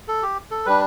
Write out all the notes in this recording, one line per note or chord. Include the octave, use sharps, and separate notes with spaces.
A4
G4
A4
G3 D4 B4